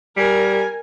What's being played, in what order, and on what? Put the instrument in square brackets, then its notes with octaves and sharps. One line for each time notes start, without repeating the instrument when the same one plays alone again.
[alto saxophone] G3 [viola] A#4 G#5